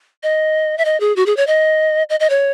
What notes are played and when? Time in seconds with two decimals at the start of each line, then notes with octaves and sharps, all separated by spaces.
0.23 D#5
0.78 E5
0.85 D#5
1.00 G#4
1.16 F#4
1.26 G#4
1.37 C#5
1.47 D#5
2.09 D#5
2.20 D#5
2.30 C#5